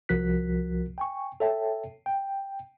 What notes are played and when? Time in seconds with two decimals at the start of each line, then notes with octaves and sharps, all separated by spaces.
0.09 C2 F3 F#4 A#4 F#6 B6
0.98 G5 G#5 C#6
1.40 A4 C#5 E5 G5 A5
2.06 G5